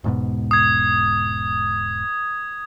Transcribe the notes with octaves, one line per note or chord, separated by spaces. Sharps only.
E1 G#2 B2
D#6 G#6